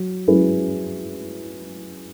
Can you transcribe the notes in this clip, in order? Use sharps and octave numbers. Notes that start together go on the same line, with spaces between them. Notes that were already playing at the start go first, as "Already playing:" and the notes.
Already playing: F#3
F#3 C#4 E4 G#4 B4